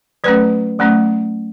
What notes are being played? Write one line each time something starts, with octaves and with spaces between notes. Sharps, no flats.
F#3 A3 C#4 B4
F#3 A3 C#4